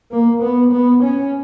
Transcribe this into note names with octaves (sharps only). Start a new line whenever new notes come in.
A#3
B3
B3
C#4